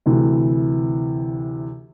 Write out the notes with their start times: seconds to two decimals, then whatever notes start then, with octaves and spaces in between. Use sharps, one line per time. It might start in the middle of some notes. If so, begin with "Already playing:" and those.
0.06 D2 C3 E3